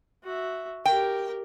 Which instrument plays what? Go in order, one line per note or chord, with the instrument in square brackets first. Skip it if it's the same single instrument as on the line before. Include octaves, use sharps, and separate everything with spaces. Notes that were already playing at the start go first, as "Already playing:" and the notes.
[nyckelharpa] F#4 E5
[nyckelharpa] G4 A#4 [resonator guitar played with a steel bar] G5